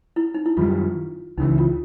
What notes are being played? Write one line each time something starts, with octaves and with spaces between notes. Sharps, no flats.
E4
D#4
E4
F#2 D#3 G3 F4
C#2 C#3 E3 D#4
F4